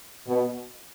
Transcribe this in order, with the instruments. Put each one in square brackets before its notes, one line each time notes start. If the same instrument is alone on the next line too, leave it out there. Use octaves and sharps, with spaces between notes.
[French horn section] B2